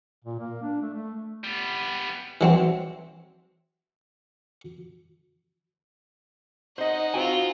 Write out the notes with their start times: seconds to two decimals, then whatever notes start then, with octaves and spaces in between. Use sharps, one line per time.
0.25 A#2
0.40 A#3
0.63 D4
0.82 A3
0.94 A3
1.44 G3 B3
2.41 E3 F#3 C4
6.78 D#4 C5 D#5 F#5
7.14 C4 F4 F#4 G5 G#5